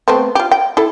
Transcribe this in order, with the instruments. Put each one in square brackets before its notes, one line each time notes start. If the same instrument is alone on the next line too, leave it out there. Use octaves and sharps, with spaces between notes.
[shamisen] A3 B3 C4
F4 G4
G5
E4 A4